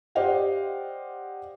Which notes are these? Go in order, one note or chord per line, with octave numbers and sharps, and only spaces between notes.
G4 C5 D5 D#5 F5 F#5